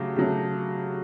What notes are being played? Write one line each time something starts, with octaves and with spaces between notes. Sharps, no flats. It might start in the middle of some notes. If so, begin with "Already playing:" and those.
Already playing: C#3 F#3 A3 G4
C#3 F#3 A3